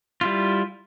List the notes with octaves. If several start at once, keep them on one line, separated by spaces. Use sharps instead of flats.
G3 E4 F4